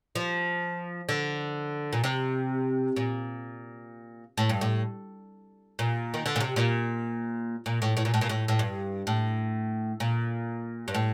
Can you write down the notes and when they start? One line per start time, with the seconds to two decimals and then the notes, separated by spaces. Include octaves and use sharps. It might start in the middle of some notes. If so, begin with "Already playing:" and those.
0.15 F3
1.09 D3
1.93 A#2
2.04 C3
2.96 A#2
4.37 A2
4.49 G2
4.61 A2
5.79 A#2
6.14 D#3
6.26 D3
6.36 A#2
6.40 C3
6.56 A#2
7.66 A#2
7.82 A2
7.97 A2
8.05 A#2
8.14 A2
8.21 A#2
8.29 A2
8.48 A2
8.59 G2
9.07 A2
10.00 A#2
10.88 G2
10.94 A2